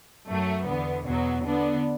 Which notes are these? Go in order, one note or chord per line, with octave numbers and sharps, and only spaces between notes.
F#2 F#3 A3
E2 D3 B3
E2 B2 F#3 B3
D3 B3 D4